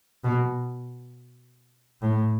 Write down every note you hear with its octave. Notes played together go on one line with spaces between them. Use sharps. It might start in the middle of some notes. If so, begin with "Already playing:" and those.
B2
A2